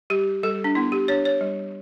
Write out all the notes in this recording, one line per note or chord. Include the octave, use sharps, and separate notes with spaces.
G3 G4
G3 A4
D4
B3 E4
G4
D4 C#5
C#5
G3